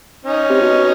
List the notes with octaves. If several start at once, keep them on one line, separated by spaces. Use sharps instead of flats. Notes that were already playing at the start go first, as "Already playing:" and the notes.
C#4 D#4
C3
B2